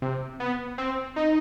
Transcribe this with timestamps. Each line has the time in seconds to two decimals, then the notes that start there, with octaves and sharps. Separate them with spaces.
0.02 C3
0.40 B3
0.78 C4
1.16 D#4